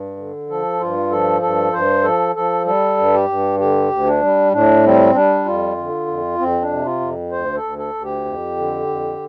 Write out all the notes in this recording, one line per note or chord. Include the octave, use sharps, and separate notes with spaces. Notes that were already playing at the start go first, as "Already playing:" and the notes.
Already playing: G2
D3
F3 A4
G2 F4
F3 A4
G2 A4
G2 C5
F3 A4
F3 A4
G3 A4
G2
G4
G2
D3 G4
D2
D4
G3
A2 D4
G3 C4
G3 D4
F2 F4
D3
F2
F2 C4
D4
C3
F4
F2
D2 C5
A4
D2
A4
D2
G4
F2
D3
F2